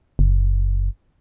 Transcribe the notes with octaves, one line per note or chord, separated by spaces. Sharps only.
F#1